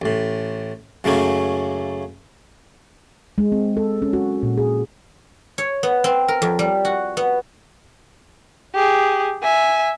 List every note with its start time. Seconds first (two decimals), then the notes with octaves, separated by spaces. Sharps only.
0.02 A1 A2
1.04 F#2 C#3 A3 A#3 C#4
3.38 G#3
3.52 C4
3.77 A4
4.02 C#4
4.13 F#4
4.43 A#2
4.58 G#4
5.58 C#5
5.83 B3
6.04 C4
6.28 A#4
6.42 F2
6.59 G3
6.85 F#4
7.17 B3
8.74 G4 G#4
9.43 E5 G#5